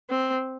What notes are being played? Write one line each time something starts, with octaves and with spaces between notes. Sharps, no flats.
C4